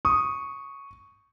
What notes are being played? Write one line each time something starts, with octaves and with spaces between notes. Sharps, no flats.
C#6 D#6